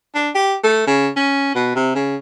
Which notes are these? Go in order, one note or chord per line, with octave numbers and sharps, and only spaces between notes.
D4
G4
A3
C#3
C#4
B2
C3
C#3